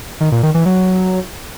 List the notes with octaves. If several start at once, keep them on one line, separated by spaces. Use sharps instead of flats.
D#3
A#2
D#3
E3
F#3